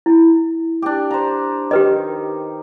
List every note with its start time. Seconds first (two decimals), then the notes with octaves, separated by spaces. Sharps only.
0.06 E4
0.82 D4 G4
1.11 C5 A#5
1.71 D#3 G4 B4 D#5